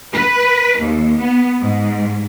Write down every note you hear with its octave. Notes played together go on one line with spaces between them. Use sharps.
B4
D#2
B3
G#2